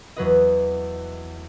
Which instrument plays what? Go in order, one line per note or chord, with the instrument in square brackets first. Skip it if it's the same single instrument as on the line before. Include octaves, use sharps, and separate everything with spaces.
[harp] E2 F#3 B4 D#5